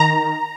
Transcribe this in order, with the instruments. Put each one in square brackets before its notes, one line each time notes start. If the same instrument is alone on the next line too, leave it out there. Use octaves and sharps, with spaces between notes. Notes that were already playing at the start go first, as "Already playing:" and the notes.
Already playing: [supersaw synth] D#3 A#5